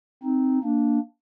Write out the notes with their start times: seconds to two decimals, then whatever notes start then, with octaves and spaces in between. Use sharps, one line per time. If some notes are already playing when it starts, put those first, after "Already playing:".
0.23 C4 D#4
0.63 A#3 D4